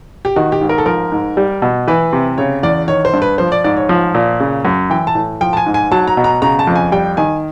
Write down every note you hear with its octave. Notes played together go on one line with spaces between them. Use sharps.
G4
D#3 F#4
G4
G#2
A#4
A4
F3 A#4
G#2
G3
B2
E3 B4
C3
C#3 C#5
E2 D5
D#3 C#5
C5
G2
B4
F3 C5
D5
G#2 D5
C#5
F3
A#2
C#3
F#2
E3 G5
A5
A2
F3 G5
A5
G#5
G#2
G#5
F#3 A5
A#5
B2
A#5
C#3 A#5
A5
F2
G#5
G3 G5
D#3 G#5